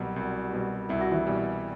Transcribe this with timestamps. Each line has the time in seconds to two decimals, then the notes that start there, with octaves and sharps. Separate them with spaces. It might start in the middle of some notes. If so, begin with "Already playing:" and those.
Already playing: C2 B2 F#3 G3 F#4
0.16 C2
0.53 B2 G3
0.89 C2 E4
1.01 F#4
1.11 E3 E4
1.27 B2 G3